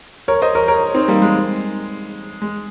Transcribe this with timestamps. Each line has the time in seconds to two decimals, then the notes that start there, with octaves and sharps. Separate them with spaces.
0.28 A#4 C#5
0.42 C5 D#5
0.55 A#4 C#5
0.68 A#4 C#5
0.94 C4 D#4
1.08 G3 A#3
1.22 G#3
2.42 G#3